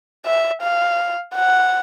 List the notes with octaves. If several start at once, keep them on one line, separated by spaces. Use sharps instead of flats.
E5
F5
F#5